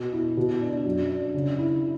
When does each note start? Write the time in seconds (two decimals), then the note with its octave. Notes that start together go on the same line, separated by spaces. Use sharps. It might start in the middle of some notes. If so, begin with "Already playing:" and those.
Already playing: B2
0.13 E4
0.37 B2
0.61 D4
0.85 F#2
1.09 D4
1.34 C#3
1.59 E4